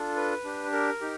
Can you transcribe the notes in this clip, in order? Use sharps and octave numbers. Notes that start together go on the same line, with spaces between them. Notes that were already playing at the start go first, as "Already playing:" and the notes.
Already playing: D4 F4 A4
B4
D4 G4
A#4
D#4 G4